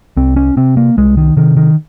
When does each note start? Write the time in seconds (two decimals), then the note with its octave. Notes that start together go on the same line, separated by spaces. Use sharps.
0.17 C2 C4
0.36 C#4
0.57 C3 C4
0.77 A#3
0.97 C2 G#3
1.17 D#3
1.37 C3 D#3
1.57 D#3